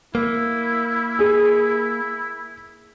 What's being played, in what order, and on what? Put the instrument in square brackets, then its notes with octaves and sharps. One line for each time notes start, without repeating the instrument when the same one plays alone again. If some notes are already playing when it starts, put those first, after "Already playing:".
[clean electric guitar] A#3 [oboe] E4
[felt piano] G#4